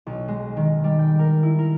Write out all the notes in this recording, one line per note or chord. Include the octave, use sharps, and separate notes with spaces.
B1
G#3
D#3
G3
G5
A#4
E4
A#4